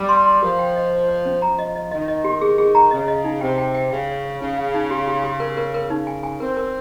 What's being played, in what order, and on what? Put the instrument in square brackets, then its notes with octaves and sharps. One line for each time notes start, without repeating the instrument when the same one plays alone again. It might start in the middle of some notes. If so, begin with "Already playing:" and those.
Already playing: [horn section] G3
[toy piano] C6
C6
[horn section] F3 [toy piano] A#4
[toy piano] G5
D#5
C5
C5
C#4
[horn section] F3 [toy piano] A#5
[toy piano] D#5
D#5
[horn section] D#3 [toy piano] D#5
[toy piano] D#5
G4
G#4
G#4
A#5
[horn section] C#3 [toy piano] D#5
[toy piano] D#5
D#4
[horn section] C3 [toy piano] G5
[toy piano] G5
G5
[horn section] C#3 [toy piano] G5
[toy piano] C#5
C#5
[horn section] C#3 [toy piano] D#4
[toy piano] F5
D#4
G4
G4
G4
A#4
A#4
A#4
[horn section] C#3 [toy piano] D#4
[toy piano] G#5
G#5
[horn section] C4 [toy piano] A#4
[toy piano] A#4